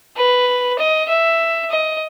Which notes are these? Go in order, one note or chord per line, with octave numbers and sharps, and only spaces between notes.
B4
D#5
E5
D#5